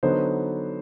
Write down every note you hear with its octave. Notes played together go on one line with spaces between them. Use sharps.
D3 F#3 B3 D#4 C5